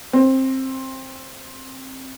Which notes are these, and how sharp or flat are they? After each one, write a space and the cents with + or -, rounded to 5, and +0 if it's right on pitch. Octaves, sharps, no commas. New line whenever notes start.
C4 +15